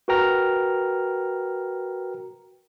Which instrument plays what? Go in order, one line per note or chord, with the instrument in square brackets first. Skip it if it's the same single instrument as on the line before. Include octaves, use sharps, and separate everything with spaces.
[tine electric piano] F#4 A#4 B4 G5 A#5 F6